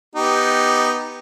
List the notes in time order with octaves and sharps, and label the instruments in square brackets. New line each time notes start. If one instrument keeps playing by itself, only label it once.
[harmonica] B3 D#4 G4